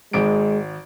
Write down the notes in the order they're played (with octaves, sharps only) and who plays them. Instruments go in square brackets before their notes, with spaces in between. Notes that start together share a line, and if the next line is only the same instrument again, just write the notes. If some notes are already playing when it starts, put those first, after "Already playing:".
[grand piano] G#1 D7 [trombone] G#3